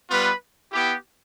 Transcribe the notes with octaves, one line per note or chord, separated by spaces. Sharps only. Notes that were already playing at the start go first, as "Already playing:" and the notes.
G3 B3 F4 B4
B3 E4 G4